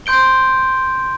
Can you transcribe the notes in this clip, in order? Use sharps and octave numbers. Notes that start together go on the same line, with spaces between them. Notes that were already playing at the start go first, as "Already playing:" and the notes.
C6 G6 D7 G7